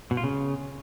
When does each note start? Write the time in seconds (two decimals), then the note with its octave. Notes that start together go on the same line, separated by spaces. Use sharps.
0.11 B2
0.17 F4
0.24 C#3